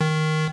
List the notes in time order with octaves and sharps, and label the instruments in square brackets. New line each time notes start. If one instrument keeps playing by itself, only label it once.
[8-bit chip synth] D#3